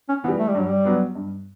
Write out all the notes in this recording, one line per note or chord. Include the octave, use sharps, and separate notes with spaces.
C#4
E3 G3 B3
A3
G3
G2 F#3
G3
F#3 B3 D4
G2